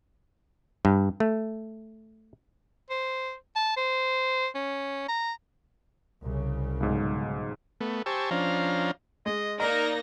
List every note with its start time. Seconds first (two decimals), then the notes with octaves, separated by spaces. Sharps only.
0.85 G2
1.20 A3
2.90 C5
3.56 A5
3.77 C5
4.55 C#4
5.09 A#5
6.23 C2 C#3
6.80 B1 G#2
7.81 A3 B3
8.06 G4 C5 G#5 A5 C#6 E6
8.31 F3 C#4 D4 C5 F5 A#5
9.26 G#3 D#5
9.60 A#3 D#4 A#4 D5 D#5 A#5 A#6